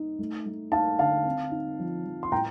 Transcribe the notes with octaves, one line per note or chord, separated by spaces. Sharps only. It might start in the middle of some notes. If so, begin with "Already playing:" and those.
Already playing: D#4
A3
A3
D#4 F5 A5
D3 F5 A5
C4
D#4
F3
F3
C6
A2 G5 A#5